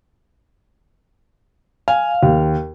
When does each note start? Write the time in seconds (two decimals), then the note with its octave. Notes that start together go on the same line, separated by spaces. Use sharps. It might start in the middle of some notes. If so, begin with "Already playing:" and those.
1.88 F5 G#5
2.23 D#2